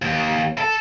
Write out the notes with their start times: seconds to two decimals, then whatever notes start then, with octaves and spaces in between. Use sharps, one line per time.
0.02 D#2
0.58 A4